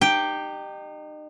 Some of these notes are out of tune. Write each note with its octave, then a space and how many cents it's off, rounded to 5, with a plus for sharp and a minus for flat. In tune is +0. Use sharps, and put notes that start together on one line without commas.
D#4 -35 G4 +0 G5 +0